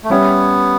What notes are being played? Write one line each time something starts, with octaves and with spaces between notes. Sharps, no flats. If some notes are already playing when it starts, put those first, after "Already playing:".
A3
G3 B3 C#4 G4 C#5 E5